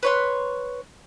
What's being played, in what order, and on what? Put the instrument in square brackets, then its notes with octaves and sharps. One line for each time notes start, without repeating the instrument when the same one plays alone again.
[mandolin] B4 C#5 C6